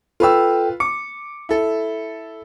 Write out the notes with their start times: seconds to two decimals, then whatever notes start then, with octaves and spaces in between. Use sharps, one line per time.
0.20 F4 A4 B4 G5 E6
0.80 D6 C#7
1.49 E4 A4